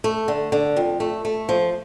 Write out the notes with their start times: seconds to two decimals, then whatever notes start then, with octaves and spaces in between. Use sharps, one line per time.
0.04 A3
0.28 D3
0.52 D3
0.77 F2
1.00 A3
1.25 A3
1.49 F3